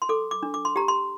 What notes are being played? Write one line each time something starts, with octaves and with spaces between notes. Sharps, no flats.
C6
A4 D6
D6
D4
D6
C6
G4 A#5
C6